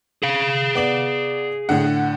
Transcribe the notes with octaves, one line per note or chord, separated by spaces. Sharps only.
G#4 F5
B3 D5 F#7
A2 D3 F#5